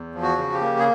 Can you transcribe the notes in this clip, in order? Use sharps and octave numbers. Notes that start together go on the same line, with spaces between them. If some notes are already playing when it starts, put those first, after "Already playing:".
Already playing: E2
F3
F#4
C#3
G4
A#3
G#4